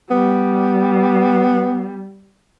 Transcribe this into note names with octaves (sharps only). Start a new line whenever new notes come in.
G3 B3